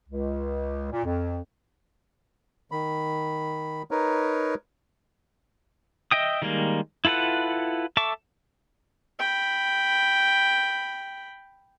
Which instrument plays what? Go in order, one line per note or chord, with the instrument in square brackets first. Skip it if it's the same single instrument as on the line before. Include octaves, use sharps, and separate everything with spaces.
[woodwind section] C#2
A#2
F2
[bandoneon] D#3 B5
D#4 A#4 B4 C#5
[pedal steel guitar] D#5 E5 G5 D#6
D#3 G3 G#3 A#3
E4 F4 A4 B4 F#5
A4 E5 A5 C#6 D6
[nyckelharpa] G5 B5